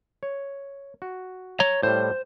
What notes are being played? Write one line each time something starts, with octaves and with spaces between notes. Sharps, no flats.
C#5
F#4
C#5 A#5
A2 G3 C5